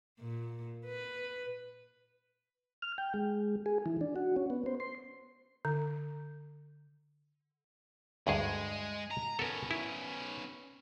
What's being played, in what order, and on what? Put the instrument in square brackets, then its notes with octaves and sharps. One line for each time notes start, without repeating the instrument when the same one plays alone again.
[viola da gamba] A#2
B4
[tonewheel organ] F6
G5
G#3
G#4
E3
D4
F#4
C#4
B3
C5
C6
[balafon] D3
[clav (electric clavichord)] D2 G2 G#4 [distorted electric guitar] G#3
[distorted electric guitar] A#5
[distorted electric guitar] B3 C#4 [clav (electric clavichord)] A4 A#4
[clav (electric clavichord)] E4